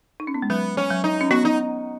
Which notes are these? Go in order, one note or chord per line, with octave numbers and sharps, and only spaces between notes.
D#4
C#4
B3
G#3
F#3 B3
C#4
F#3
D#4
C#4
B3 F#4
D#4